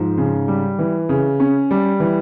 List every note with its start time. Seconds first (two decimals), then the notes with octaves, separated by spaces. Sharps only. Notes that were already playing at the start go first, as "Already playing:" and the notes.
Already playing: G#2 F3
0.18 C#3
0.48 G3
0.79 E3
1.09 C#3
1.40 C#4
1.71 G3
2.00 E3